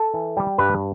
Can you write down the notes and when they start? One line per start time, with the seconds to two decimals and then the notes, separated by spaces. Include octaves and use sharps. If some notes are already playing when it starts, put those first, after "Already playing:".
Already playing: A4
0.14 E3
0.37 G3
0.58 G2 B4